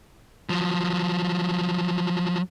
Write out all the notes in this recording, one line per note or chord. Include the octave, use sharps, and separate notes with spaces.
F3 F#3